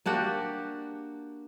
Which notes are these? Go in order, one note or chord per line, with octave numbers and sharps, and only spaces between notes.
A#3 D4 F#4 G4